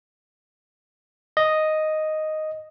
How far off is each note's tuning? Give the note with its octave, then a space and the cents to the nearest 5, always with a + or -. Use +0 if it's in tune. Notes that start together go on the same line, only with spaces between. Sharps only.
D#5 +0